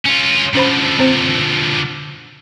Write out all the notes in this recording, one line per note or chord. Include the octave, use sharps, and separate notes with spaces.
C#4 F4
D3 F3 C#4 C5 B5
C4 C5